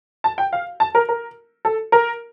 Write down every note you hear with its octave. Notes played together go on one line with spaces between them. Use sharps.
A5
G5
F5
A5
A#4
A#4
A4
A#4